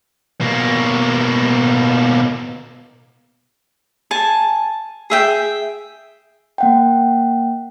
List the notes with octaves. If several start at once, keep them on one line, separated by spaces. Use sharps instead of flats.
B2 A#3
G#5 A5
G#4 E5 G5
A#3 F#5 G5